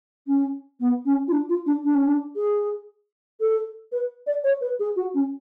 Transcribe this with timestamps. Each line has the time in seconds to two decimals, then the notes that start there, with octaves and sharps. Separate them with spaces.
0.27 C#4
0.80 B3
1.05 C#4
1.28 F4
1.32 D4
1.49 F4
1.66 D4
1.84 D4
1.95 C#4
2.07 D4
2.36 G#4
3.40 A4
3.92 B4
4.27 D5
4.44 C#5
4.61 B4
4.80 G#4
4.96 F#4
5.14 C#4